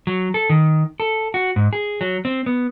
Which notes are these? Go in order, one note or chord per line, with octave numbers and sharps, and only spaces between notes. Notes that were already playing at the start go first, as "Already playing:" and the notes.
F#3
A4
D#3
A4
F#4
G#2
G#4
F#3
C4
B3